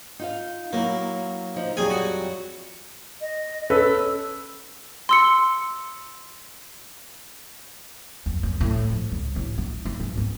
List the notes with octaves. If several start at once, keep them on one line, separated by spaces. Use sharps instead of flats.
D#4 F4 F5
F#3 A#3 E4
F3 D#4
F2 F#3 G3 G#4 G#5
F#4
D#5
C#4 A4 B4 E6
C6 E6 C#7
F2
F#2
A2
F3
C#2
A1
D#4
D#4
G#2
C4